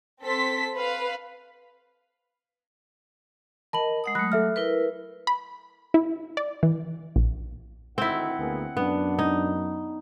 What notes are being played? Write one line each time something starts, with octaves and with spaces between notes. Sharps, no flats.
C4 A4 C6 B6
B4 F5
A#4 D#5 A5 B5 F#7
G#3 F#5 D#6
F#3 A3 B5 D#6 F#6
A4 E5 F6
E4 A#4 B4
B5
E4
D5
E3
A#1
D2 D#3 C4 E4 F#5
D2 A#3 B3 G#4
F#2 B3 D4
D#4